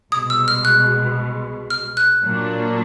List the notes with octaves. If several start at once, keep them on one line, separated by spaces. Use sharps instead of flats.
C2 B2 G#3 D#6
E6
F6
F#6
F6
F#6
A#2 F#3 A#3 D4